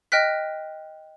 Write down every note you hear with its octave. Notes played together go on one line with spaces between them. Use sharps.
D#5 G5 F6 F#6 B6